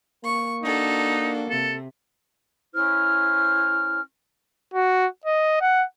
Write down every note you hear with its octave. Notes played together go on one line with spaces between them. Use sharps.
A#3 C#6
D4 D#4 F#4 A4
C3 A4
C#4 E4 C5 F6
F#4
D#5
F#5